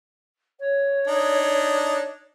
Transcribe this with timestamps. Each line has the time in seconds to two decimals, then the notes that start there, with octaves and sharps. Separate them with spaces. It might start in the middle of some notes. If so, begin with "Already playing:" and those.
0.60 C#5
1.08 D4 D#4